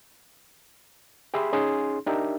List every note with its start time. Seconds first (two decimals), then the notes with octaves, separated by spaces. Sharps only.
1.34 G4 G#4 E5 B5 C6
1.53 C#4 D#4 G#4 C6
2.06 D4 D#4 G4 A#4 E5